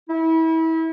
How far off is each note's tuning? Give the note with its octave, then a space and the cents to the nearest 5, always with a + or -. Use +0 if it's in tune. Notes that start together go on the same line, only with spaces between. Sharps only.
E4 -30